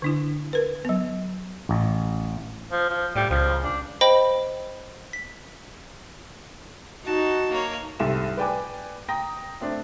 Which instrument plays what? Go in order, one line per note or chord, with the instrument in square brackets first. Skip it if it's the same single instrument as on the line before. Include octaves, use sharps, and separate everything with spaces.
[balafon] D3 D4 E4
A#4 B4
F#3 B3
[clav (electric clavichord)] A1
[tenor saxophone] F3
F3
[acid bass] A2 [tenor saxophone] G3
[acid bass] C#2 [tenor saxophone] F3
[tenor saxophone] D4
[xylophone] C5 D#5 G5 B5
B6
[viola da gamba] D#4 [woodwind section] F#4 [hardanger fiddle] A5
[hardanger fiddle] A#3 C#5
[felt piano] C2 G#2 E4 G4 A4 E7
B4 D5 G5 G#5 D6
G5 A#5 D#6 A#6
A3 C4 D4